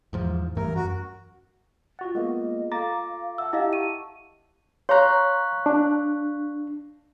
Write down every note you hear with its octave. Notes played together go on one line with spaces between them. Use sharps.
E2 G#2 F3
G2 E3 A3 A#4
F#2 F#4
F4 F#4 F#5 A6
G#3 A#3 B3 D#5
A4 F5 A#5 D6 A6 A#6
E5 F#5 A5 E6
E4 G4 D#5 F5 E6
A5 C#6 D#7
C#5 F5 A#5 C6 C#6 F#6
D4